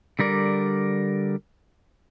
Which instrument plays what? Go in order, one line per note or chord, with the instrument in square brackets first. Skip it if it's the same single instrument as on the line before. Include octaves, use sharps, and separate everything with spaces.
[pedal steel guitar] D3 G3 A#4 D5